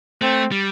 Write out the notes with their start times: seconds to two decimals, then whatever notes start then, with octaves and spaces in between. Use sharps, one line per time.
0.22 A3 C4
0.52 G3